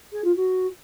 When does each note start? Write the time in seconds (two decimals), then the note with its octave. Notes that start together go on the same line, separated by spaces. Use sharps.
0.12 G#4
0.24 F4
0.36 F#4